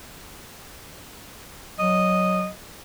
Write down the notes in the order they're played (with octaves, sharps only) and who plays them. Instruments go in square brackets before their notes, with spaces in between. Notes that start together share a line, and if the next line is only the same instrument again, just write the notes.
[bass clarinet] F#3 [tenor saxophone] D#5